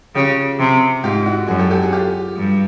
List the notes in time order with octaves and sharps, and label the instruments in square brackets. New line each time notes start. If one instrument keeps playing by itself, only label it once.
[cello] C#3 [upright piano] F4 G4
[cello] C3
[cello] G#2 [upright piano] F4 G4
[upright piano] E4 F#4
[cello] F#2 [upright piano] F#4 G#4
[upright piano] G4 A4
G4 A4
F#4 G#4
F4 G4
[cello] G2